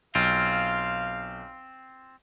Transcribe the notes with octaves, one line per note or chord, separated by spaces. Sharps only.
B1 C4 F4 F5